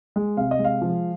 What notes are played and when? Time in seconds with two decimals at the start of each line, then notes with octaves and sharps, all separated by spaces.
0.16 G#3
0.37 C3 F5
0.51 D#5
0.59 G#3
0.65 F5
0.82 F3